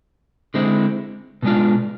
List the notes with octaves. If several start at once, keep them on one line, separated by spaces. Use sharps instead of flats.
D3 G#3 C4 E4
B2 G#3 D4 F4